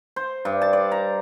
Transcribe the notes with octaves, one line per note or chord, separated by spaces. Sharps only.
C5
G2
A5
D5
A#5